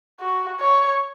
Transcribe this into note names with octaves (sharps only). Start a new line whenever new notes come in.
F#4
C#5